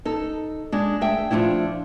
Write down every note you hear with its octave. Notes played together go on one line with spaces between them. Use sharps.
D#4 A4
G#3 D4
A3 G#4 E5 G5
F3 F#3 A3 D4 E4